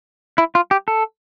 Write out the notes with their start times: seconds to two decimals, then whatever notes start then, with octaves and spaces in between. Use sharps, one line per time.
0.38 E4
0.55 F4
0.71 G4
0.88 A4